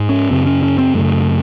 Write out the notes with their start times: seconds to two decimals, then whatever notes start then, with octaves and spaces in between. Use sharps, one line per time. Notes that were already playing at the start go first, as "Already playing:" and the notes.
Already playing: G#2
0.09 C#4
0.31 F#2 C#3 C4
0.46 C#4
0.63 C#4
0.78 C4
0.94 F#2 C#3 A3